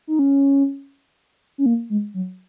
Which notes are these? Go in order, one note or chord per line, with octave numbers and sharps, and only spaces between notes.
D#4
C#4
C#4
A#3
G#3
F#3